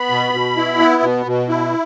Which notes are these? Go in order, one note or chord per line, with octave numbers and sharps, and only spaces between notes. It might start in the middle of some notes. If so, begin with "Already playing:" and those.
Already playing: B3 B5
B2
B2
E4
B3
B2
B2
E4